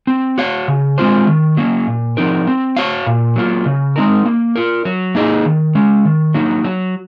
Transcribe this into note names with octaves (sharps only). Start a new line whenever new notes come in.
C4
F#4 C#5 F5
C#3
G#3 C4 F4 C5
D#3
F#3 A#3 C#4
A#2
F3 C4 D#4 A#4
C4
F#4 C#5 F5
A#2
F#3 A#3 F4
C#3
G#3 C4 D#4 A#4
A#3
F4 A#4
F#3
A#3 D#4 G#4 D#5
D#3
G#3 C#4
D#3
F#3 A#3 D#4
F#3